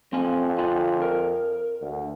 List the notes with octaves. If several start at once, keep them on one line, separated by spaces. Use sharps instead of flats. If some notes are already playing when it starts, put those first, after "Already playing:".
F2 C4 G#5
D3 F4 G#5
A#4
D2